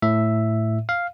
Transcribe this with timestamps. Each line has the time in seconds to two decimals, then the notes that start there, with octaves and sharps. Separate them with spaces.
0.02 A2 E5
0.89 F5